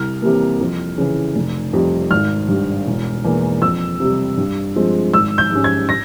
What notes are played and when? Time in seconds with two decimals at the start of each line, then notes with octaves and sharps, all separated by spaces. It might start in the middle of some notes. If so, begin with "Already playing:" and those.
Already playing: C2 F6
0.22 C3 E3 G3 A#3
0.61 F2
0.98 C#3 E3
1.36 F1
1.73 F2 C3 G3
2.11 G#1 F6
2.48 G2
2.54 G3
2.87 E1
3.24 E2 E3 A#3
3.62 F2 E6
4.00 C3 G3
4.37 G2
4.76 F3 G#3 C4
5.14 G#1 E6
5.38 G6
5.51 G#2 G3 C#4
5.64 G#6
5.89 A#6